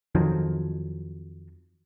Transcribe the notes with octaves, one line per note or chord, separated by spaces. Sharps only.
F2 D#3 F3 F#3